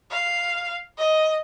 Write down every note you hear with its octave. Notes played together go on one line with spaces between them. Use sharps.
F5
D#5